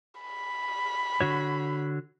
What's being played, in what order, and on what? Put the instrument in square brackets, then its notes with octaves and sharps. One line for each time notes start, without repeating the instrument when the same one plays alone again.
[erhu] B5
[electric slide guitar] D3 F#4 C#5